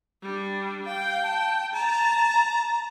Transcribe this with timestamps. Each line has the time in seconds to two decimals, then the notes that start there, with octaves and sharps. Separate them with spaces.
0.22 G3 D4
0.86 F5 G5
1.23 A5
1.74 A5 A#5